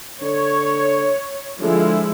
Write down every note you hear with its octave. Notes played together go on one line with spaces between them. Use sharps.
D3 C#5
D3 F3 G#3 E4